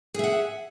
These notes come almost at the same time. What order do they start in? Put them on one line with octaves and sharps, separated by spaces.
G#4 E5 F#5